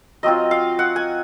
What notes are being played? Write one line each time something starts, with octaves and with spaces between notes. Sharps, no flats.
F#3 C4 F4 D#5
F5
F#5
G#5